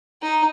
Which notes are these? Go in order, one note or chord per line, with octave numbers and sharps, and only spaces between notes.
D#4